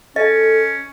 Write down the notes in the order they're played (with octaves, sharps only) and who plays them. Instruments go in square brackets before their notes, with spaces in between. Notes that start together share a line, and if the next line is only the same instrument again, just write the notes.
[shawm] C#4 [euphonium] A4 [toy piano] D#5